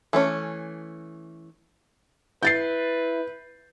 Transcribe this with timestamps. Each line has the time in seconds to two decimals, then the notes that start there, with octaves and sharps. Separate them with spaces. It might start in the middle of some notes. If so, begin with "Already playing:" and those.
0.13 E3 A3 C#4
2.43 E4 B4 G6 A6 C7